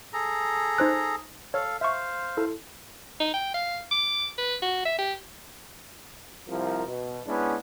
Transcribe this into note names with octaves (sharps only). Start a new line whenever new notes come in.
G#4 A4 A#5
D#4 C5 F#6
A4 C#5 F5
C5 E5 F5 C#6
E4 A4
D#4
G5
F5
D6
B4
F#4
E5
G4
C2 F3 A#4
B2
G#3 B3 C#4 D4 E4